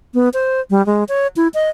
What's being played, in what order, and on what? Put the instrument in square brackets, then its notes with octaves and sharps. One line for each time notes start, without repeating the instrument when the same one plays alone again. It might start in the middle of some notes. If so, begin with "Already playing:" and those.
[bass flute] B3
C5
G3
G#3
C#5
E4
D#5